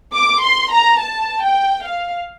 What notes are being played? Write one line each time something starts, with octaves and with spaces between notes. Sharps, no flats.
D6
C6
A#5
A5
G5
F5